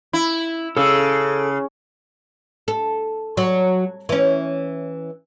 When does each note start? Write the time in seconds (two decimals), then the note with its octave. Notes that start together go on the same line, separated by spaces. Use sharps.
0.13 E4
0.77 C#3 A4 E6
2.68 A4
3.37 F#3
4.09 E3 C#4